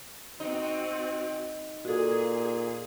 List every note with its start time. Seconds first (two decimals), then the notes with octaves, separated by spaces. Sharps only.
0.40 C4 D#4 F#4
1.85 A#2 F#4 G#4 A4